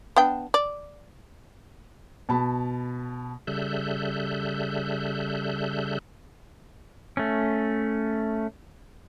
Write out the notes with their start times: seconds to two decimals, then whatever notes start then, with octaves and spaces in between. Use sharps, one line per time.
0.16 B3 D4 G5
0.54 D5
2.29 B2 A5 B5
3.47 C#3 G3 A4 E5 F#6 G6
7.17 A3 C#4